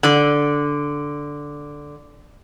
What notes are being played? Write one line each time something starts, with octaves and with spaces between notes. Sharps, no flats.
D3 D5